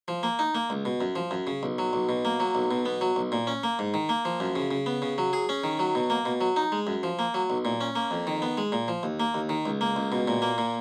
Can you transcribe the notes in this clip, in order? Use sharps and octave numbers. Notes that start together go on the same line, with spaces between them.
F3
A#3
D#4
A#3
C#2
B2
F#2
F3
F#2
C#3
B1
F#3
B1
B2
A#3
F#3
B1
B2
B3
F#3
B1
A#2
C#4
A#3
G#2
D#3
A#3
F3
F#2
C#3
C#3
B3
C#3
F#3
G#4
C#4
D#3
F#3
B2
A#3
B2
F#3
D#4
G#3
F#2
F3
A#3
F#3
B1
A#2
C#4
A#3
F2
D#3
B3
G#3
A#2
F3
D#2
A#3
D#2
D#3
C#2
A#3
C#2
B2
A#2
A#3
A#2